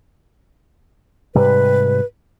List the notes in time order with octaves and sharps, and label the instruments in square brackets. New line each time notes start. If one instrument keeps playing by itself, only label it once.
[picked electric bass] G#2 C3 G3 [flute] B4